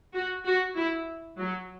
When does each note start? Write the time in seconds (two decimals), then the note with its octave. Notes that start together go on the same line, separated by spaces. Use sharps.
0.15 F#4
0.46 F#4
0.76 E4
1.39 F#3